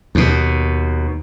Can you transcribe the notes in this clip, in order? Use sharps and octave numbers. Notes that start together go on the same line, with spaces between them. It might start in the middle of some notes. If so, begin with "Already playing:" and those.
D#2 B2